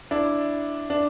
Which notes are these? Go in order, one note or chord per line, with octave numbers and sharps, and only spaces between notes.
D4 E4
D4